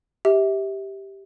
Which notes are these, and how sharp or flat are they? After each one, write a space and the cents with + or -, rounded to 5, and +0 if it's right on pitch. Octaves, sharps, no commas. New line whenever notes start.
G4 +0 E5 -30